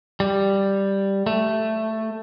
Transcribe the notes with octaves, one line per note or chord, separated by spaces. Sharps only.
G3
A3